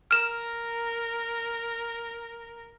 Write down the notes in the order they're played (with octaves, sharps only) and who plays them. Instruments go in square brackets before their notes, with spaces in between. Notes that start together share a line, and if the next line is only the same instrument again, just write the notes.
[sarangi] A#4 [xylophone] F6 E7